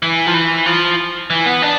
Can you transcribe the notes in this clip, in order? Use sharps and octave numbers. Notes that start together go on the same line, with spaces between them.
E3
F3
E3
F3
E3
B3
D4